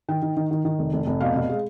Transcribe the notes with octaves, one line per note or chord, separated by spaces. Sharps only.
D#3 G5
D#3
D#3
D#3
D#3
F1
F1
F1
B2 F5
B2
G#3